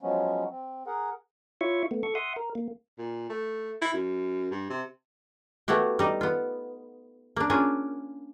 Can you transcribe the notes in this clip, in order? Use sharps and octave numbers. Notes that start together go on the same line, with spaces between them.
F3 F#3 G#3 B3 C#4
C4
G#4 A#4 F#5
E4 F4 C#5 E5 C#6
A3 B3
A4 C#6
E5 F#5 C6 D#6
A#4
A#3
A#2
A3
E4
F#2
G2
C3
A3 B3 E4 F#4 G4
G3 D#4
B3 F4
A#3 D4
C#4 D4 F4 G#4 A#4